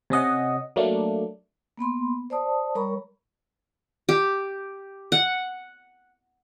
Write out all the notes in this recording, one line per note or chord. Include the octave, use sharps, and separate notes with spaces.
C3 C#4 D#5 F#5
F#3 A3 A#3 D4
A#3 B3 B5 C6
C5 D5 A5 D#6
G3 A#4 C#5 A#5 B5 C#6
G4
F#5